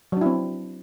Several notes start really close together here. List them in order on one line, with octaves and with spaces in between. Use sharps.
F#3 D4 E4 C4